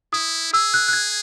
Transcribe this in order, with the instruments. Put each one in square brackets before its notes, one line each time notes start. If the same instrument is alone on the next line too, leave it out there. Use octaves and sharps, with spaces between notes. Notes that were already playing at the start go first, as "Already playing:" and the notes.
[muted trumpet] E4 [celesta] D#6
[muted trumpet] G#4 [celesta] E6
[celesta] F#6
F#6
G#6